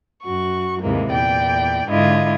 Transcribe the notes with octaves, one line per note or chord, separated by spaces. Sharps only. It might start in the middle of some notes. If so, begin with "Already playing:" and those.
F#2 F#4 C#6
D#2 G#2 C3 E3 G#3 A#3
E2 A#2 D5 G5
G#2 D3 E4 F4 D#5 G#6